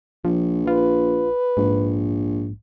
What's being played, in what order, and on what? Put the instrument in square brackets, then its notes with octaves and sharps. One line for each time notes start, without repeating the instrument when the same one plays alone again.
[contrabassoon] A#1 [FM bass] F3
[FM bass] F4 [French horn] B4
[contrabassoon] A#1 [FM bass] G#2